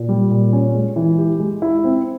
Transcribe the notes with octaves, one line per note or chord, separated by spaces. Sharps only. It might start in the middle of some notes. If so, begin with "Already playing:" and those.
Already playing: A#2
G3
A#2
C#4
G#3
E3
G4
G#3
E4
C4